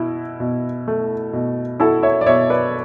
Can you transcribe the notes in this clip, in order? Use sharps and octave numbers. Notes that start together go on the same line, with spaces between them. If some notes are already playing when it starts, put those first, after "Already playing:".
Already playing: B2 E4
B2
A3
B2
E4 F#4 A4
C#5 E5
D5
B2 C#5 E5
B4 D5